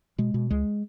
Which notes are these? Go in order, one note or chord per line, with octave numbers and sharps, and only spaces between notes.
B2 G#3
B2
C#2 G#3